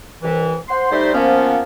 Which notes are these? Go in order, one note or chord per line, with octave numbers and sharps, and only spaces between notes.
C2 E3
C5 F#5 C6
G3 A3 D#4 C5
F3 A#3 B3 C#4